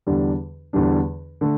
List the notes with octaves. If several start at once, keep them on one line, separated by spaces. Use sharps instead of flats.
E2 D3 G3 D4
E2 D3 G3 D4
D3 A3